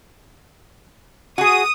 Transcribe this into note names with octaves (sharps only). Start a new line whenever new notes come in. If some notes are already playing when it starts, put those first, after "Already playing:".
F#4 G#4 D#6